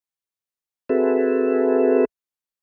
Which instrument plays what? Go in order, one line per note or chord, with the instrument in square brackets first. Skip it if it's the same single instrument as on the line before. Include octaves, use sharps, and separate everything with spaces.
[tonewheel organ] C4 F#4 G#4 A4 B4 E5